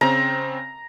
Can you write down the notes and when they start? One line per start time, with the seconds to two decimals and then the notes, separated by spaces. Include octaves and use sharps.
0.01 C#3 C4 A#5